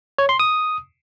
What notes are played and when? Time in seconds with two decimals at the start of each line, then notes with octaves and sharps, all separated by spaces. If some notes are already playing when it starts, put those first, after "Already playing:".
0.18 C#5
0.29 C6
0.40 D#6